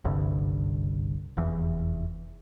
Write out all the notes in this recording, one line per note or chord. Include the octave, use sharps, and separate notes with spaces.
F#1 C2 G2 D3
F1 E2 E3